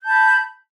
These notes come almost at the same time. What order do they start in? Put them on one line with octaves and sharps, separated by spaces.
G6 A5 B5